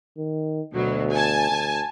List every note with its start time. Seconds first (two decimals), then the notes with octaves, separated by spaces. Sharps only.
0.18 D#3
0.74 D2 B2 F#3
1.12 G#5 A5
1.50 D2